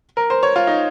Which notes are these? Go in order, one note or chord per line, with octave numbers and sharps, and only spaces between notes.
A#4
C5
C#5
F4
D#4